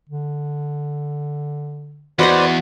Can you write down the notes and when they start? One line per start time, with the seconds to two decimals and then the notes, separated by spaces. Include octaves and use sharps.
0.09 D3
2.19 E2 F#4 B4 C5 D5 D#5 F#5